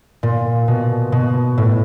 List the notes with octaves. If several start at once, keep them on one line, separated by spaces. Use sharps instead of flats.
A#2
B2
B2
A2